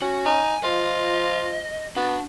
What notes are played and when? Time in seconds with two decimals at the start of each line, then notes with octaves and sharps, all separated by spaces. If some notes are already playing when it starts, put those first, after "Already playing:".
0.02 C#4 F#4
0.25 D#4 G#5
0.63 F3 F4 D#5
1.96 B3 D4 F#4